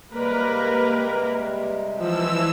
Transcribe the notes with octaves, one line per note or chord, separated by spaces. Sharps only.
C3 G3 G#3 A#3 A#4 B4
E3 F3 E6